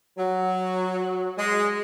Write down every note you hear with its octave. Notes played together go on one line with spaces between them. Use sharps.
F#3
G#3